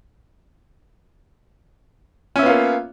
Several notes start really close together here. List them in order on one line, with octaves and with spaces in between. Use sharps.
C#4 E5 B3 F4 A#3